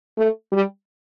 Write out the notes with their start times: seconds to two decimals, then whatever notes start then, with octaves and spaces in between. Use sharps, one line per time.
0.18 A3
0.52 G3